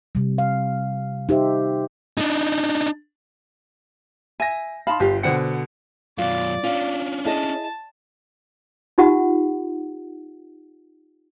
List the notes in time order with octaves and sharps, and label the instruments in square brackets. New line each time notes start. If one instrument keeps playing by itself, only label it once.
[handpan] C3 G3
F5
D#4 G4 C5 E5
[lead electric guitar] D4 D#4
[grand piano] E5 A#6 [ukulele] G#5
[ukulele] D#4 A5 B5 [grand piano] F5 C6
[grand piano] G1 [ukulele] F4 G4 F5
[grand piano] B2 D3 C#7 [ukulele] C5 F#5 G5
[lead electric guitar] F#2 B2 [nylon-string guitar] F4 [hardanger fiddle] D5
[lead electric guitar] C#4 D4 [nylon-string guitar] F4
[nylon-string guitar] E4 G#4 D#5 [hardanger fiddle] A5
[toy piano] D#4 F4 G4 F#5